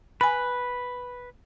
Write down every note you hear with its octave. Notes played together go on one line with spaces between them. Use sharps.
B4 G#5 B5